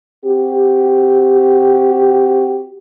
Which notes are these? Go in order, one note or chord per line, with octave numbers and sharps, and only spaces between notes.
C4 F#4 G4